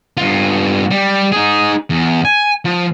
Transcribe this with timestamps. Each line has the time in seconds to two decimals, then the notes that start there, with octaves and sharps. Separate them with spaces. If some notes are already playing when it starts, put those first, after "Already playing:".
0.17 G2 F4
0.91 G3
1.32 D#4 G#4
1.90 E2
2.25 G#5
2.65 F3